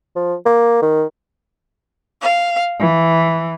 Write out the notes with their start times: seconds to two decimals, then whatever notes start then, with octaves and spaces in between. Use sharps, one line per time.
0.16 F3
0.46 A#3
0.82 D#3
2.22 F5
2.80 E3